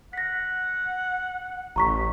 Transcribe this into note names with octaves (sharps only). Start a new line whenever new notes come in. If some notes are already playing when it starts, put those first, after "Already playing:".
F#5 A#6 B6
A1 A#5 C#6 B6